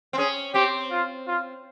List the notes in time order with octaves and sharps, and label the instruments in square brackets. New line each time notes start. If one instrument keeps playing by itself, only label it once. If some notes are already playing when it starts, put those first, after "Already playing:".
[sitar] C4
[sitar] C#4 [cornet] G#4
[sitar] C4 [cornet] G4
[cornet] F4
F4